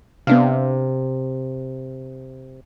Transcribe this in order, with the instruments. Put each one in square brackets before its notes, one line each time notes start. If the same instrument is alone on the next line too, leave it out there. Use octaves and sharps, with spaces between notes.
[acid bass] C3 [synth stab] B3 D4 F5